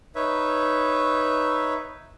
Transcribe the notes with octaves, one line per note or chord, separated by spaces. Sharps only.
D#4 B4 C#5 E5